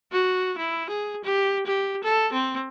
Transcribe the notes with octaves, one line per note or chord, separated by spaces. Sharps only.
F#4
E4
G#4
G4
G4
A4
C4